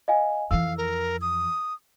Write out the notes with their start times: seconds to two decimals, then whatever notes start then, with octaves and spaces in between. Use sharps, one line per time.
0.08 D#5 F5 G#5
0.51 F2 E3 F5 E6
0.77 A#4
1.21 D#6